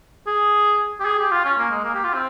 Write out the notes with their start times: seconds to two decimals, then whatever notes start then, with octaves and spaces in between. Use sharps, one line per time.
0.27 G#4
1.00 G4
1.05 G#4
1.19 G4
1.31 F4
1.45 C#4
1.58 A#3
1.71 G#3
1.84 A#3
1.94 G4
2.04 F4
2.14 C4